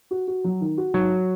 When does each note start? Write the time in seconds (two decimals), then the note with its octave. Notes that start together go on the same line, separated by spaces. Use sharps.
0.11 F#4
0.28 F#4
0.44 F#3
0.61 D#3
0.78 F#4
0.94 G#2 F#3